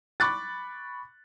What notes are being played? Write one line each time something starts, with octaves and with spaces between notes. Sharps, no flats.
B5 C#6 D6 F#6 A6